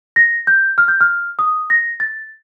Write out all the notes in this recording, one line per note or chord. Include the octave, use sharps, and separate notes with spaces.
A#6
G6
F6
G6
F6
D#6
A#6
A6